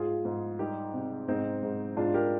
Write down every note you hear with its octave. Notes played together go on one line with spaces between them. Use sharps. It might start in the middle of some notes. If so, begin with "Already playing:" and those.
Already playing: G#2 F4 G#4
G#2
G3 D#4 G4
C3
G#2 C4 D#4
G#2
G#2 D4 F4
G4 A#4